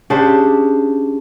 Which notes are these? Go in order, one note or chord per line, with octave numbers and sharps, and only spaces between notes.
C#3 D4 G4 C5